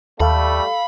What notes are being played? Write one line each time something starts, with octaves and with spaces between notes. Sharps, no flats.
D#2 G3 A3 A4 F5 B5